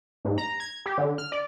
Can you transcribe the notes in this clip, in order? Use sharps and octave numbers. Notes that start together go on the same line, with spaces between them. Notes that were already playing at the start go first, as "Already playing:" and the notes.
G#2
A#5
G#6
G4
D3
F6
D5